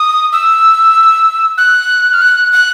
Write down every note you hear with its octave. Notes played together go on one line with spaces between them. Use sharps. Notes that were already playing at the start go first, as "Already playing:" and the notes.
Already playing: D#6
E6
F#6
F6
F#6
F#6